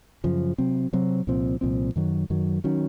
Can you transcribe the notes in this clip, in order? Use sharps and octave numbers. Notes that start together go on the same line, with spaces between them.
F#2 C#3 F3
C3 F#3 C4
C3 F#3 C4
C2 A#2 F3 C4
C2 A#2 F3 C4
F#2 D#3 F#3
F#2 D#3 F#3
D#3 F#3 C#4